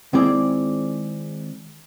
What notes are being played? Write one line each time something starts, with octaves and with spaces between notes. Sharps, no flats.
D#3 G#3 C4 E4 G#4 D5